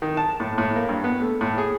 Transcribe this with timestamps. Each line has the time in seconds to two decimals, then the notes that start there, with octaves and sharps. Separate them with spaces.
0.02 D#3
0.17 A5
0.40 A2
0.58 A2
0.76 A#3
0.89 G2
1.04 B3
1.22 A3
1.41 A2
1.58 G#4